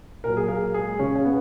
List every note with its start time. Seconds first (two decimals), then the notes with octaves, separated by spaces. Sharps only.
0.24 A#2 F#3 A#4
0.37 G#4
0.48 A#3 A#4
0.74 G#3 G#4
0.99 C#3 C#4
1.15 C#4
1.25 B3